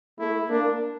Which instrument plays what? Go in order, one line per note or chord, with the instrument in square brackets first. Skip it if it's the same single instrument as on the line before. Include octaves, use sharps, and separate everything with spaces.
[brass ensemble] A3 [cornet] E4
[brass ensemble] A#3 [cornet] D4